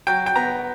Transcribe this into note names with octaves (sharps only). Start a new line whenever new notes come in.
F#3 G5
G5
B3 A#5